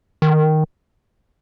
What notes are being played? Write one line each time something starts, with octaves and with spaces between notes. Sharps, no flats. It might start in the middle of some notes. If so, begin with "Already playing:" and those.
D#3